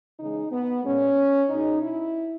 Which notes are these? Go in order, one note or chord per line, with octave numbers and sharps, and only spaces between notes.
C#3 E3 G#3 D#4
B3
A#2 G#3 C#4
B2 G#3 D#4
E4